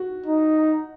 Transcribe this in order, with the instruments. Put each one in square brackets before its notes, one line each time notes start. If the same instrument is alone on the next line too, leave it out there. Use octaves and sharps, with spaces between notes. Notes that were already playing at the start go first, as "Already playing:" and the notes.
Already playing: [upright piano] F#4
[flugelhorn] D#4